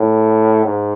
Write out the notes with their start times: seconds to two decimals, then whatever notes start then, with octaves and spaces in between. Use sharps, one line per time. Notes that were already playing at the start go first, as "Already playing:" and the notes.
Already playing: A2
0.65 G#2